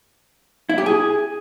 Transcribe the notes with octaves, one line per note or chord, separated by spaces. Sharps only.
E4
G4
G#4